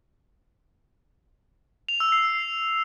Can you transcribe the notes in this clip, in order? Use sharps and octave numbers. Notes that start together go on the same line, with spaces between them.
F7
E6
C7